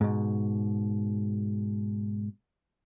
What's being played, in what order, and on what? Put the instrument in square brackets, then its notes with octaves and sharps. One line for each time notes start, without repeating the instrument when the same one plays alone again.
[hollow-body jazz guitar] G#2 B2